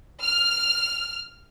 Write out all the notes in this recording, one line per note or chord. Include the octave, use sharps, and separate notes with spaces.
F6